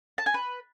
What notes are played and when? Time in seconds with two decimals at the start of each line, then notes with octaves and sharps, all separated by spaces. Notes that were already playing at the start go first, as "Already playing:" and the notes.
0.18 A5
0.26 G#5
0.34 B4